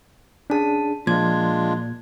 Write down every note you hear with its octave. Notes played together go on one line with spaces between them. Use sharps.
C#4 D4 G#4 A5
A#2 F3 G#3 D4 F4 G#6